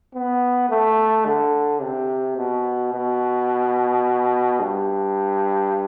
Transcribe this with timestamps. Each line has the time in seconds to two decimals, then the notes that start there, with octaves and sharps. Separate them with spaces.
0.14 B3
0.70 A3
1.25 D3
1.81 C3
2.37 B2
2.93 B2
4.60 G2